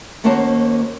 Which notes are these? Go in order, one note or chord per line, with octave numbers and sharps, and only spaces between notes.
D#2 A#3 C#4 F#4 C5 A5